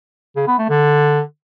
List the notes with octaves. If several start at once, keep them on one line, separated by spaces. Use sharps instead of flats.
C#3
B3
A3
D3